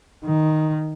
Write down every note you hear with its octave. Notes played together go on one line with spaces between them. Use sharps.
D#3